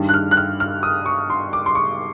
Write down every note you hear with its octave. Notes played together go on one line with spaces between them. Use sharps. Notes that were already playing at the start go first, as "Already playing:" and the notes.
Already playing: G2 D#3 G3
F#6
F6
F#6
F6
F6
D#6
C#6
C6
D6
C6
C#6